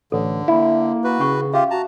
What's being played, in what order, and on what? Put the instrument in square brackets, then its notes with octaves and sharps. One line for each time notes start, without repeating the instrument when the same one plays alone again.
[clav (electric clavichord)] A1 [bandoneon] D3 [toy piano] A4
[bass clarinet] A#3 [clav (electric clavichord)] E4
[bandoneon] F#4 B4
[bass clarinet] C#3 [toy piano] C#4 F#5 C#6
[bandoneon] F4 G4 [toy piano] E5 F5
[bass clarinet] F#4 [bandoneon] A5 A#5